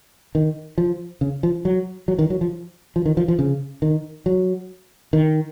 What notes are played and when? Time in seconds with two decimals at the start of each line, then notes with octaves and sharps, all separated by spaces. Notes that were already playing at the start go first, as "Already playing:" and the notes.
0.35 D#3
0.78 F3
1.21 C#3
1.43 F3
1.65 F#3
2.08 F#3
2.19 D#3
2.30 F#3
2.41 F3
2.96 F3
3.06 D#3
3.17 F3
3.28 F3
3.39 C#3
3.82 D#3
4.26 F#3
5.13 D#3